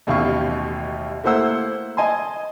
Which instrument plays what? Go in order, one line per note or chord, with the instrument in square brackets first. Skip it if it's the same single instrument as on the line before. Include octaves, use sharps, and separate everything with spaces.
[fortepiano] A1 D#2 B2 G4 F5 C#6
A3 A#3 E4 C5 F#5 E6
D#5 G#5 A5 C6